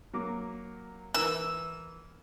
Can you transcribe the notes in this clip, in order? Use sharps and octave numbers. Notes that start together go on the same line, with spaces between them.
F#3 A#3 D6
E3 A#4 E6